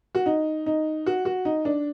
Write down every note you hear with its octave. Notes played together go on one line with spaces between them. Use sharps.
F#4
D#4
D#4
F#4
F#4
D#4
D4